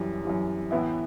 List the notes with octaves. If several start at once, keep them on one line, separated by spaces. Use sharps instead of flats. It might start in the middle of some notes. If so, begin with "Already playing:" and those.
Already playing: F#2 E3 G3
F#2 E3 G3
A2 E3 B3 E4